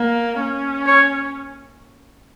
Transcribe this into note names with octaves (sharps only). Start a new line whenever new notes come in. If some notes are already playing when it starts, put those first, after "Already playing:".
Already playing: A#3
C#4
C#5